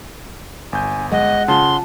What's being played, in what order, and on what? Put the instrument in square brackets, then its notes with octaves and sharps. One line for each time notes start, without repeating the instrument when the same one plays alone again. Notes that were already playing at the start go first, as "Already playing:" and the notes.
[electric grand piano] G1 G6 [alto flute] G#5
[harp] G#3 [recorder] D#5 [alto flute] F#5
[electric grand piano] C#3 [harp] F4 A5 [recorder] C6